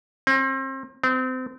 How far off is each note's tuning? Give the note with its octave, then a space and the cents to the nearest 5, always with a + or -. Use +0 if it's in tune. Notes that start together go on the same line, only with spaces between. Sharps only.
C4 +35
C4 -30